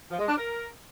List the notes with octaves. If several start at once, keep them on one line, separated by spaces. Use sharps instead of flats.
F3
G#3
D4
A#4